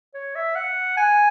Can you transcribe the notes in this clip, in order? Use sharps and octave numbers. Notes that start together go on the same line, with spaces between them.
C#5
E5
F#5
G#5